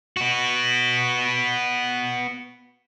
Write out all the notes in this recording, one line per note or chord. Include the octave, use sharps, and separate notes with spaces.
B3 F#4